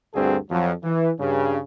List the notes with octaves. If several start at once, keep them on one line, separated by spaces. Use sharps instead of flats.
D2 G2 C4 F#4 G#4 A4
F2 F3 F#3
E3
G2 C#3